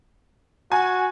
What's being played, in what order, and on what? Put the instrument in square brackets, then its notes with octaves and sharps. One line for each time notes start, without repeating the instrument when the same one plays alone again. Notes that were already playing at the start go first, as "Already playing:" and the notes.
[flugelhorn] F#4 [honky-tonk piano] G#5